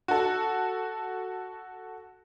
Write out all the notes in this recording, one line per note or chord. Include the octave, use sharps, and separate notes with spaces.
F#4 A4